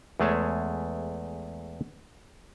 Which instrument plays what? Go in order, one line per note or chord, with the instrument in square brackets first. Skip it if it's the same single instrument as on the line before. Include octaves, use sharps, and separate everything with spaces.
[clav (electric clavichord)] E2 G#3 A3 G#4 C#5 A5